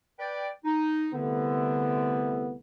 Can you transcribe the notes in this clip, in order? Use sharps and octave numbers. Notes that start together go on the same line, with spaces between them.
B4 D5 G5
D#4
C2 D3 A3 B3